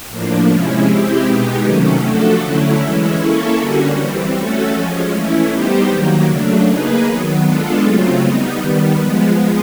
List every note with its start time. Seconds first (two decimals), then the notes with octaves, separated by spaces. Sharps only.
0.09 A2 F3 A#3 D4
0.48 C3 F3 G#3 C#4 E4
0.86 G#3 C4 E4 G4
1.26 B2 G#3 B3 D#4 G4
1.63 C3 D#3 F#3 A3 C#4
2.03 F3 A3 D4 F#4 A4
2.41 D3 F#3 A3 C#4 E4
2.79 E3 G#3 C#4 E4
3.18 A#3 C#4 E4 A4 C#5
3.57 D3 G3 A#3 C#4 F#4
3.96 E3 G3 C4
4.34 A3 C#4 F#4 A4
4.73 F3 G#3 C#4
5.12 E3 A3 C#4 E4
5.51 G3 B3 D#4 G4 C5
5.88 D#3 F#3 A#3
6.28 C#3 F#3 A3 D4
6.67 A#3 D#4 G#4 B4
7.05 D#3 F#3 B3
7.43 G#3 B3 D4 F4 A4
7.82 C#3 F#3 A3 C4 F4
8.21 G3 B3 D#4
8.59 D#3 G3 B3
8.98 F3 G#3 B3